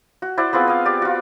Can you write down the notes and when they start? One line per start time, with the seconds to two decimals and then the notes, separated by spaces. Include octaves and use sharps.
0.22 F#4
0.37 E4 C5 D5 F#5
0.53 B3 C4 F4 G#4
0.68 D#5 F5
0.85 G4 D5
1.02 F4 F#4